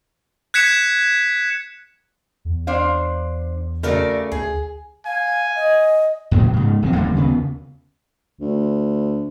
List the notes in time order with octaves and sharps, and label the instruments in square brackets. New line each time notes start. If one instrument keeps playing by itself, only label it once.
[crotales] F#6 G#6 B6 C#7 E7
[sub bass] E2
[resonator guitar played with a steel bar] D4 C5 F5
[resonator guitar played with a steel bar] C#3 A3 [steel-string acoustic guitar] F#4 A#4 D5
[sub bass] D2 [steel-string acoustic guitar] G#4
[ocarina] F5 [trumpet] G#5
[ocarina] D#5
[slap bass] E2 A#2 C#3 F#3
G#2 C#3
D1 F3 G3 C4
E2 D3 G3 A#3
D#2 C#3 B3
[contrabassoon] D2